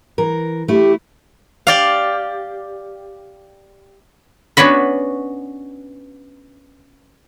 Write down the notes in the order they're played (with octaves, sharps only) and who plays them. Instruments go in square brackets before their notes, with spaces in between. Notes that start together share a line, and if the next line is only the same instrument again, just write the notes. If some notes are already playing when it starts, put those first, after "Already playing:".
[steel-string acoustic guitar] E3 A#4
[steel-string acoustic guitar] A3 E4 [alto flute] G4
[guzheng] G4 D5 F5
[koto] B3 C#4 D4 F#4 B4